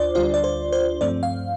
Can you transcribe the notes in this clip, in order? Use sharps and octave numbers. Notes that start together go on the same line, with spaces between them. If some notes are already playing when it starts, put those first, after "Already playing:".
Already playing: D2 D4 F4 C5 D5
D2 D3 G3 D4 F4 C5
D5
C5
C5
G2 F3 A3 C4 D5
F5